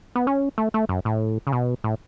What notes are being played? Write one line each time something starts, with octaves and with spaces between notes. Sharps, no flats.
B3
C#4
A3
A3
F#2
A2
C#3
B2
A2